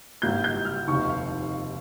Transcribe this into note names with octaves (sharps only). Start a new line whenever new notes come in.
G#1 G2 G3 A#3 G6
G6
F6
F1 D#2 D#3 C#6
F5